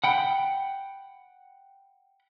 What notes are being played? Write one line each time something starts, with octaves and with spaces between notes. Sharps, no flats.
F#5 G5 B5